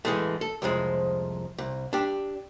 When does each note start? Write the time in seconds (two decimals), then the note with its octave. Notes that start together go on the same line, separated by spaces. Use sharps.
0.05 E3 G#3 A3
0.41 A4
0.62 C2 F2 F3 G#3
1.58 C2
1.93 D4 G4